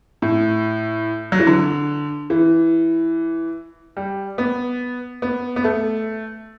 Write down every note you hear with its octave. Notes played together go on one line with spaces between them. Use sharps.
A2
F#3
E3
D3
E3
G3
B3
B3
B3
A3